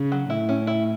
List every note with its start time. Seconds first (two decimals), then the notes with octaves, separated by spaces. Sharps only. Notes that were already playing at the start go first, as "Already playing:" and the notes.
Already playing: C#3
0.12 F#3
0.30 A2 E4
0.49 C#4
0.67 E4